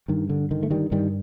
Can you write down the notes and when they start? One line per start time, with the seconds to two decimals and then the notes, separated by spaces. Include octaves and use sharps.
0.08 G2 D#3
0.30 D3
0.51 D3 D#3
0.63 A3
0.71 D#3 G3
0.91 G2 D#3 G3